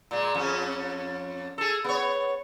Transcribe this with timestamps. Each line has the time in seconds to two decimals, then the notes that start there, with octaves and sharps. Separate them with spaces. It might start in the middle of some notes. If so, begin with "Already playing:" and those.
0.11 A#2 G#3
0.34 F2 C#4
1.58 G#4 A4
1.84 B3 C#5